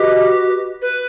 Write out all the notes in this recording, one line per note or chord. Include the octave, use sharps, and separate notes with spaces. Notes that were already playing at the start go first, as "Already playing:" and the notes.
Already playing: F#4 G4 B4 D#5
B4